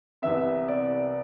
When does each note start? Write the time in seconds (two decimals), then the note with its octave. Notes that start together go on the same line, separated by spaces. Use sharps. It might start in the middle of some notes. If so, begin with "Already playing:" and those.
0.22 C2 C3 E3 B3 E5
0.68 D5